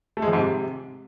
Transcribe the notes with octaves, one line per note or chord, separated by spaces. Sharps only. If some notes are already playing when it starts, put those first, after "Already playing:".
A3
G#3
F3
G#2
C3